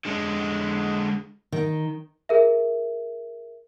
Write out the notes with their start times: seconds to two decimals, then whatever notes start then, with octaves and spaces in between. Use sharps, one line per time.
0.05 D3 G#3
1.52 D#3
2.29 G#4 A#4 E5